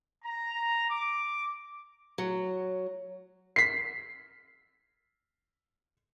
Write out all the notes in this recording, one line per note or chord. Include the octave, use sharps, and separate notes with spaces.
A#5
D6
F#3
B6 C7